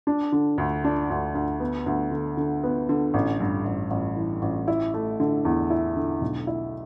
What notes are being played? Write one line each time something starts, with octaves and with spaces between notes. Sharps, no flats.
D4
D3
D2
D4
D2
D2
B3
D2
D3
D3
B3
D3
A1
G2
A1
A1
E3
A1
E4
A3
D3
E2
E4
D3
B1
E4